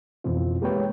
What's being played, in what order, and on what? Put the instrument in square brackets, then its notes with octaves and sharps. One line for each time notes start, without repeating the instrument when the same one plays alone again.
[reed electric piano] F2 B2 E3 C4 F4
G#3 A#3 G4 B4 C#5 G5